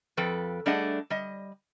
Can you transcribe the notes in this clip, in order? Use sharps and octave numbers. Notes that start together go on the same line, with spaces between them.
F2 F3 A4 B4 G5
G3 A3 D4 G#4 D#5 F#5
G3 D#5